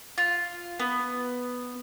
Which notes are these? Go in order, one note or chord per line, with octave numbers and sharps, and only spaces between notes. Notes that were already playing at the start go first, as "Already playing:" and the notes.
F4
B3